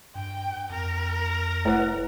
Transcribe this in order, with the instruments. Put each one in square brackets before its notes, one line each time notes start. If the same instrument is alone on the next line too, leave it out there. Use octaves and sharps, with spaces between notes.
[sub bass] G2 [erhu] G5
[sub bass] F2 [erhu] A#4
[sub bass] F1 [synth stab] A2 F#5 [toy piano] E4 B4